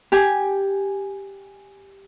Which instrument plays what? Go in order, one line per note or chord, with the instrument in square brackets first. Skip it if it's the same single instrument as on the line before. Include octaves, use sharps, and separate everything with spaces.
[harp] G4 G#5